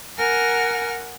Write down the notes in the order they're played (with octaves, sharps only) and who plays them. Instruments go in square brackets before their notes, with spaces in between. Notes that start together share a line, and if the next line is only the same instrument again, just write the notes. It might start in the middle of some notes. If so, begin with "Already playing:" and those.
[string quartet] A#4 F#5 G#5 F6